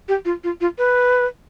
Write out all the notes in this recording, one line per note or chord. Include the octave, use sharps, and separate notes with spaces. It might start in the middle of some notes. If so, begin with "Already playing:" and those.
G4
F4
F4
F4
B4